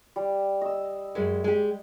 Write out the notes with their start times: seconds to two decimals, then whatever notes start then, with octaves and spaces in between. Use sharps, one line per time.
0.16 G3
0.61 D#5 E6
1.15 F#2 G#3
1.44 G#3 G4